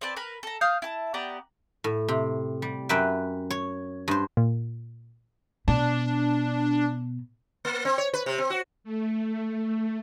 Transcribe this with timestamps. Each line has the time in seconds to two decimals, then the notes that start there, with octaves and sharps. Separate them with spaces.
0.01 C4 B4 D5 A5
0.16 A#4 B4 B5
0.43 A4 A#5
0.61 F5 D#6 F6 G6
0.82 E4 A5
1.14 B3 G4 D5 A#5
1.84 A2
2.08 C3
2.62 G3
2.89 F#2 B4 E5 G5
3.50 C#5
4.08 G2 C5
4.37 A#2
5.68 B2 D4
7.65 A#3
7.85 C4
7.98 C#5
8.14 B4
8.26 C3
8.38 C4
8.50 F#4
8.84 A3